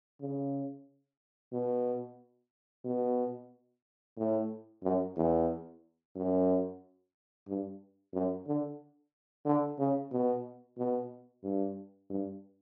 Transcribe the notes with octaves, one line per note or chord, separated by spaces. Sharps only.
C#3
B2
B2
A2
F#2
E2
F#2
G2
F#2
D3
D3
C#3
B2
B2
G2
G2